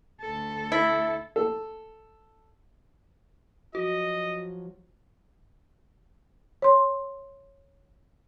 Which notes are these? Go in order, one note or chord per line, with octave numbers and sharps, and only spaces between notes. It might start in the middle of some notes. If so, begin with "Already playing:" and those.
D2 A4
E4
A4
F3 F#3 F#4 D#5
C#5 C6